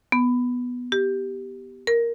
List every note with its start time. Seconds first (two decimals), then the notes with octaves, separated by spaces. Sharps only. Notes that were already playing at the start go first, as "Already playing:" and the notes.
0.12 B3
0.92 G4
1.87 A#4